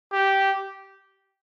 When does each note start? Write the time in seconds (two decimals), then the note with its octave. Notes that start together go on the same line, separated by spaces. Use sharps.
0.13 G4